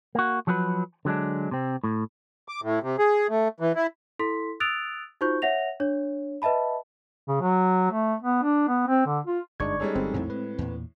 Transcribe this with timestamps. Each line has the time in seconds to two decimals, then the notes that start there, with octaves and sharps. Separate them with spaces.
0.15 A#3 F#4
0.47 F3 F#3 F#4 A4 B4
1.05 D3 F#3 G#3 D4
1.51 C3 C4
1.84 A2
2.48 D6
2.63 A2
2.83 C3
2.98 G#4
3.30 A3
3.60 E3
3.75 E4
4.19 E4 A4 C6 B6
4.60 D#6 E6 F#6 A6 D7 F7
5.21 D#4 F4 F#4 C5 C#6 G6
5.42 C#5 E5 F#5 A#6 F7
5.80 D4 C#5
6.42 B4 D#5 E5 A5 B5
7.28 C#3
7.41 F#3
7.91 A3
8.22 B3
8.43 D4
8.68 B3
8.88 C4
9.06 D3
9.27 F4
9.60 G1 F#2 G#3 D4 D#4 D5 C#6 G#6
9.80 G3 G#3 C#4 D#4 A4 C#5
9.95 G1 C4
10.14 A#1 F2 A2 A3
10.30 G#3 B4
10.59 E2 A#2